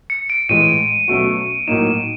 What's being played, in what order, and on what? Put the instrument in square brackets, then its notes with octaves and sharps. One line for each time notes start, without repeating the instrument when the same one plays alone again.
[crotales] C#7
D7
[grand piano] A2 E3 G#3 [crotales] D#7
[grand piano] B2 F#3 A3 C#4 F#4
[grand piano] A2 F#3 A#3 D#4 [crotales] E7
[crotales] E7